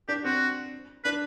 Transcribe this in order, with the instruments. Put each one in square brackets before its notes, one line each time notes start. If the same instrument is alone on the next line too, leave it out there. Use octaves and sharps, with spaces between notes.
[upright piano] D4 [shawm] G4
[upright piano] C4 [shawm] F#4
[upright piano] D4 [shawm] B4